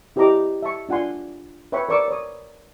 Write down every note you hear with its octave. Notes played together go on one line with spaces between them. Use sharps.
E4 G4 C5 D#5 A#5 D6
E5 A5 C#6
D4 F4 F#5 G#5 C6
B4 C#5 E5 G5 B5 C#6
A#4 C5 D5 C#6 D6 E6
C#5 D#6